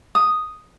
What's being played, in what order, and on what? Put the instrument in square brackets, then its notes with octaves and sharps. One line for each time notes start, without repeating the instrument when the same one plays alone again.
[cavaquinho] D#6